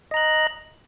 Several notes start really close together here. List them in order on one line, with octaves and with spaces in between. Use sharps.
D#5 A#5 F#6